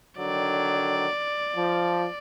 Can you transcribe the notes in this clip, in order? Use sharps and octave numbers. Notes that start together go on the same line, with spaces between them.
D3 D#3 F#3 D5
F3